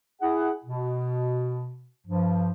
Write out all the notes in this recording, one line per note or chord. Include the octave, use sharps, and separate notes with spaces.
E4 G#4 F#5
B2
G2 F3